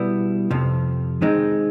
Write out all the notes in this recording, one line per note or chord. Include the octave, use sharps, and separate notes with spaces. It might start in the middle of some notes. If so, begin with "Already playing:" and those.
Already playing: B2 G3 B3 E4
F2 C3 F3
D#3 G#3 C4 D#4